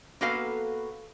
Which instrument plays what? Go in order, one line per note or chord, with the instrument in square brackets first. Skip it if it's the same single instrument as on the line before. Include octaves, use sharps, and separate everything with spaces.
[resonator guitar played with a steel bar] A#3 B3 F#4 A4 B4 F5